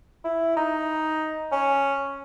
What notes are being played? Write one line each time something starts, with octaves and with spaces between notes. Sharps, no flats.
E4
D#4
C#4